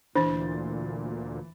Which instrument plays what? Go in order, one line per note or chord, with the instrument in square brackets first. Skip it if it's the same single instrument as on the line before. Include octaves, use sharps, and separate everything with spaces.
[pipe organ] D2 A#2 [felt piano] E3 A6 [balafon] D4 [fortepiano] C5